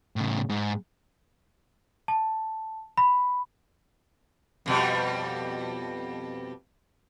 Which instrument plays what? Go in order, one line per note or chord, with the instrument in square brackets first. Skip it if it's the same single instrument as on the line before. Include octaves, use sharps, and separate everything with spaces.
[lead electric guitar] A2 C#3
G#2
[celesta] A5
B5
[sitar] F2 B2 G3